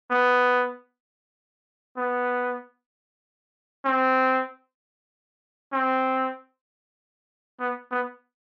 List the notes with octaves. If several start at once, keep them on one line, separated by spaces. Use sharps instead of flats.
B3
B3
C4
C4
B3
B3